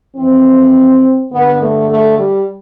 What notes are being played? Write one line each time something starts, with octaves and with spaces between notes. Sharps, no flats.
F2 E3 C4
G2 D3 B3
A3
A3
G3